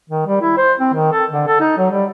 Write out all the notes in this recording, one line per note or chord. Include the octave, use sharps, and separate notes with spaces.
D#3
G3
E4
C5
C4
D#3
A4
D3
A4
D#4
F#3
G3